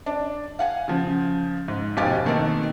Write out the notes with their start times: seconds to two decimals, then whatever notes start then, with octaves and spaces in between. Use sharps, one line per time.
0.06 D4
0.59 F5 F#5 G#5
0.88 C#3 F3
1.68 G#2
1.97 F1 B2 G4 F5 G#5 A6
2.25 B2 D#3 A3 A#3 C4